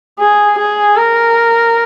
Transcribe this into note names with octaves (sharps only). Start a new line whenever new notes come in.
G#4
G#4
A#4